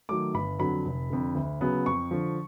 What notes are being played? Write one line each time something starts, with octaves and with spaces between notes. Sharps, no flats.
D#3 F#3 A3 D6
G1 B5
F2 D3 F#3 B5
F1
F2 D3
D2
C#3 F#3 B3
F2 C#6
D3 F3